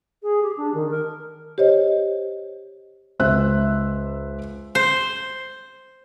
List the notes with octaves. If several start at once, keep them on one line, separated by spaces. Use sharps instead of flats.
G#4
G4
D4
D#3
A#4
G4 C5 C#5 D#5
C#2 C5 E5 F#6
C5